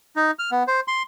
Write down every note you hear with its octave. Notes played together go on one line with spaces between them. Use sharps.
D#4
F6
B3
C5
C6